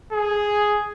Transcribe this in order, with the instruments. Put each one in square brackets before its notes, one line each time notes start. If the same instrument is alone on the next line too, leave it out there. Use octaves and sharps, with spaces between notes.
[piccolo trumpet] G#4